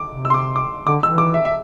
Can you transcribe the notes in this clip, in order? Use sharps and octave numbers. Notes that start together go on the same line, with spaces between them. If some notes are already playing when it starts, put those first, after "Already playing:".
Already playing: D6
C3
E6
C6
D6
D6
D3 D6
E3 E6
D6
E5
E5